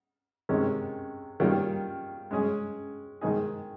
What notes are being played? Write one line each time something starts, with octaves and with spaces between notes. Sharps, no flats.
C3 D#3 G#3 C#4
D#3 G3 A#3 C#4 F4
G#3 C#4 G#4
D#3 G#3 D#4 G#4